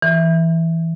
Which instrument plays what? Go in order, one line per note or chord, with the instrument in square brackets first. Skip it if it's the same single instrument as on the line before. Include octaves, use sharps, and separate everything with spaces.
[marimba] E3